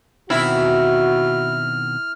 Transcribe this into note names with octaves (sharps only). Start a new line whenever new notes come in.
B2 D#3 C4 E4 F#4 F6